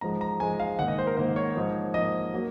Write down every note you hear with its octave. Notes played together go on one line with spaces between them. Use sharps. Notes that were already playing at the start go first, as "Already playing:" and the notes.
G#2 F3 G#3 A#5
A#5
G#2 F3 G#3 G#5
F5
G#2 D#3 A#3 F#5
D#5
C5
A#4
G#2 D#3 A#3 C5
C#5
G#2 F3 A#3
G#2 F3 A#3 D#5
F#3 A#3